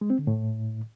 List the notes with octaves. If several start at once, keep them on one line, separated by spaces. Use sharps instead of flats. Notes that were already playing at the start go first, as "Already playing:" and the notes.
G#3
C4
D3
A2